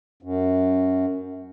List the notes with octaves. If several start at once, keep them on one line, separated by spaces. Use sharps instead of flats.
F#2